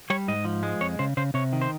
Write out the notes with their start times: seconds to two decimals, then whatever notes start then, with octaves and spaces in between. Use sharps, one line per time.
0.10 G3 C#5
0.28 G#2 D#5
0.45 F3
0.63 G#3
0.81 F2 C#5
0.99 C#3 C5
1.17 C#3 C5
1.34 C3 C#5
1.53 D#3
1.61 C5